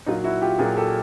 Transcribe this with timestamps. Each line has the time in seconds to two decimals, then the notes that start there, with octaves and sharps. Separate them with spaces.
0.06 A#2 F#3 D#4 F4
0.24 E4 F#4
0.42 F4 G4
0.59 A#2 F#3 F#4 G#4
0.76 G4 A4